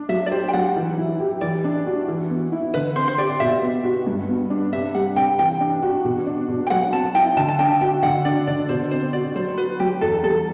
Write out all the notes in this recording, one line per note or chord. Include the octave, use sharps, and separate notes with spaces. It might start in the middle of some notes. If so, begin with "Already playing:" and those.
Already playing: D4
F#3 E5
D5
G4 C5
G5
F#3 F#5
E3
E4
G4
E3 D5
D4
F#4
E3
B3
E4
D3 B4
C4 C5
C5
G4 D5
B2 E5
B3
F#4
G2
B3
D4
C3 E5
G3 F#5
C3 G5
E3 G5
D4
F#4
B2
D4
B2
G5
F#3 F#5
C4 A5
E4 G5
D3 A5
A5
D4 G5
F#4 G5
D3 F#5
D4 D5
D3 D5
B2 C5
C4 C5
F#4 D5
F#3 C5
F#4 B4
F#3 G4
E2 A4
G3 A4